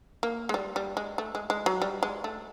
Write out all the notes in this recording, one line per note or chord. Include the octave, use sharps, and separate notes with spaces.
A#3
G#3
G3
G3
G#3
A3
G#3
G#3
F#3
G3
G#3
A3